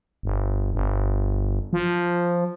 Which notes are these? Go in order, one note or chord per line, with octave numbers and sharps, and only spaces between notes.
G1
G1
F3